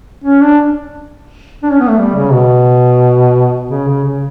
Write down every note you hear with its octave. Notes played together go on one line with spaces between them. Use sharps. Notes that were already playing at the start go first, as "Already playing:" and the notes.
C#4
D4
D4
C#4
B3
A3
G3
C#3
B2
C#3
C#3
C#3